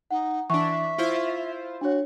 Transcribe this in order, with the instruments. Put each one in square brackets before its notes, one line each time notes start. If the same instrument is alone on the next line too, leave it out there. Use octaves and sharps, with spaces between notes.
[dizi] D#4 [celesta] F#5
[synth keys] E3 D4 [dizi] E5 [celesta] C#6
[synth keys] E4 F4 C5
[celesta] D4 C#5 [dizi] F#4